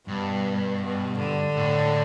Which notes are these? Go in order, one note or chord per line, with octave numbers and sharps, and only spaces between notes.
G2 B2
B2
D3
A2